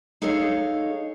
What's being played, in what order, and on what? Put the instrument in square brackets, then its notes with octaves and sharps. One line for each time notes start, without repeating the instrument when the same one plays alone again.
[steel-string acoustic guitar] D#4 G#4 A4 C#5 D#5 F5